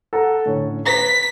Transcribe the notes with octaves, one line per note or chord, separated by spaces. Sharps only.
A4 F#5 A#5
A2 D3 C#4
B4 A#5 B6